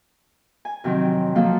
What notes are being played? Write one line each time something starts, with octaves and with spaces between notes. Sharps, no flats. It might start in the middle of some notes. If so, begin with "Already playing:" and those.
G#5
F2 C3 D#3 F#3 C4
F3 F#3 A#3 F4 A4